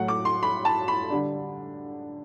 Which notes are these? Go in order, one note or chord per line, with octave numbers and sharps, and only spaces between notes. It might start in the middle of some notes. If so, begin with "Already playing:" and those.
Already playing: A2 F#3 A3 F#5
D6
C6
B5
A5
B5
D3 G3 D4